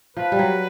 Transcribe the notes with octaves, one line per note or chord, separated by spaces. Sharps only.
F3 B4
G3
F#3